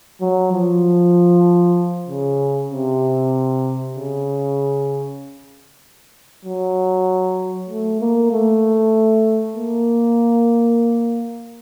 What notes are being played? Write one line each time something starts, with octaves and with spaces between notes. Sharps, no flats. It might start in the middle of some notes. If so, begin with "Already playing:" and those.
F#3
F3
C#3
C3
C#3
F#3
A3
A#3
A3
A#3